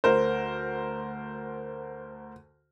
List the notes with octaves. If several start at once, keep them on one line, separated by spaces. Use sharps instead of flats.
D2 A#4 C5